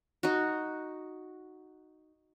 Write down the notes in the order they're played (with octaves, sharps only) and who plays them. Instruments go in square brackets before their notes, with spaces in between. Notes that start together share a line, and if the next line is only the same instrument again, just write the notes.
[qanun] D#4 F#4